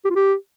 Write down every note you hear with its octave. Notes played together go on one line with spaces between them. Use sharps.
G4
F4
G4